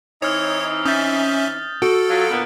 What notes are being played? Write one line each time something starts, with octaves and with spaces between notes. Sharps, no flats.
E3 C4 D#4 C#5 D#6 F6
C#4 E5 D#6 G6 A6
F#4 A4 D7
F#3 F4
A#2 D3 B3